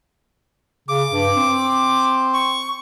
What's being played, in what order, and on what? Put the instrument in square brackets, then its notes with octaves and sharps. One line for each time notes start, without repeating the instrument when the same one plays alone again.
[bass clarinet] C#3 [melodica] D6
[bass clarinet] G2
C4
[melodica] C#6